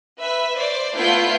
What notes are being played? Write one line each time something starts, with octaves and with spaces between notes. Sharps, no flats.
B4 E5
C5 D5
A3 B3 E4 F4 G6